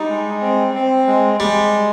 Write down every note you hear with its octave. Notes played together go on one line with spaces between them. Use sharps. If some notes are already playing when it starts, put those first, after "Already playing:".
Already playing: G3 D#4
G#3
C4
C4
G#3
G3 G#3